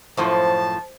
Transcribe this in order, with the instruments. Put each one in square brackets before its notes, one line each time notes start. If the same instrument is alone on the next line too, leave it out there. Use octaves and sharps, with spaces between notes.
[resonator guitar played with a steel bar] F#2 A2 F3 [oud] C5 [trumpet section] A5